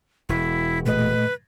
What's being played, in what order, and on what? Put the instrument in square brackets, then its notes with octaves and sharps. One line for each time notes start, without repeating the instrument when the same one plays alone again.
[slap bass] E1 [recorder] E4
[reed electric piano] A#2 A3 D#5 [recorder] B4